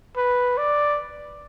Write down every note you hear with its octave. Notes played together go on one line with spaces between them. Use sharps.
B4
D5